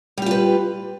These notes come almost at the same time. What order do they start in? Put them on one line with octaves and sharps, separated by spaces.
G3 G4 F4 B4